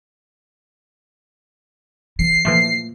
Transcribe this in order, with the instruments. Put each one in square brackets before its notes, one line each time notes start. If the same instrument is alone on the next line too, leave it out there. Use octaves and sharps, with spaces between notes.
[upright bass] E3 [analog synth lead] C7
[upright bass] A#2 [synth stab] E3 F3 A3